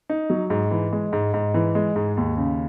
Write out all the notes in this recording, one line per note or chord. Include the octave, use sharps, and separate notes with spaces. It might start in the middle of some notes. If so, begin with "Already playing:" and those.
D#4
F#3
G#2
E3
G#3
G#2
G#2
E3
G#3
G#2
D#2
C#3